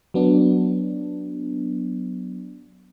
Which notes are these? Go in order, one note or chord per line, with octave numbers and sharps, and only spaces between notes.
F#3 B3 D4